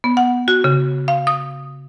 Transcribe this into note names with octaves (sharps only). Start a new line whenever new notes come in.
B3
F#5
F#4
C#3
F5
D#6